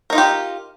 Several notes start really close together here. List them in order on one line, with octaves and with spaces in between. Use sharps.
A#4 D#4 F4 G4